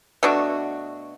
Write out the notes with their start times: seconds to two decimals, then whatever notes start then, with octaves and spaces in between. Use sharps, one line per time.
0.23 B2 A3 D4 F#4